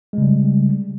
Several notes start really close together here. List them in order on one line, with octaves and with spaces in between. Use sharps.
G#3 C#3 G3